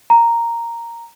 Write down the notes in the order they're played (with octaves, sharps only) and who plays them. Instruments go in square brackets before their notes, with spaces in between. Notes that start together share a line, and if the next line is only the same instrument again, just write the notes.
[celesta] A#5